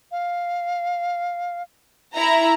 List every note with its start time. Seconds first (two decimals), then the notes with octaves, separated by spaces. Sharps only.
0.11 F5
2.15 E4 A#5